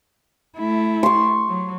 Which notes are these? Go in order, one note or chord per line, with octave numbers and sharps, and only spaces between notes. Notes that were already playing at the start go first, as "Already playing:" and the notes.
A3 E4
C6 C#6
F#3